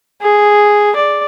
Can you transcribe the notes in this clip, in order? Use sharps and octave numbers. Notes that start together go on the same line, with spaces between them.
G#4
D5